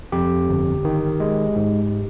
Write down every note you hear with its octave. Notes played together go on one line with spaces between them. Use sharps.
F2 G4
G1
D#3
G#3
G#2